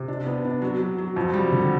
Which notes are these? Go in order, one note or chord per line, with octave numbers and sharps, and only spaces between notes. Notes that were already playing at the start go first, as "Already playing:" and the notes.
Already playing: C3
D4
B3
D4
F#3
F#3
F#3
F2
G3
D3